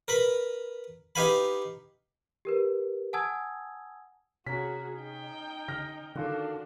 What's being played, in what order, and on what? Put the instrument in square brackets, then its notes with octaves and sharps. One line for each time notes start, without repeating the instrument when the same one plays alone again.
[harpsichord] A#4 B4 B5
D#4 G4 B4 F5 G#5 B5
[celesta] G4 A#4 B4
F#5 G#5 A5 D#6 E6 G#6
[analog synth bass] C3 [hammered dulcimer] C#4 A#5 [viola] F#4 G#4 [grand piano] B6
[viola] D#4 G5
[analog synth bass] D3 [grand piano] F6 A#6
[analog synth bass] D3 [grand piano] D#3 F4 A4 [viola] D4 [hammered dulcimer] F#4